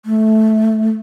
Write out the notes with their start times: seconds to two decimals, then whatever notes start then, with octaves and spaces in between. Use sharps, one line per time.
0.05 A3